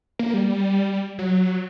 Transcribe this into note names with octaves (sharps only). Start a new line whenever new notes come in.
A#3
G3
F#3